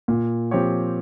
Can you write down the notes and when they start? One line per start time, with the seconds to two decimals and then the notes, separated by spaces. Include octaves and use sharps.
0.08 A#2
0.51 F3 C4 G4 C#5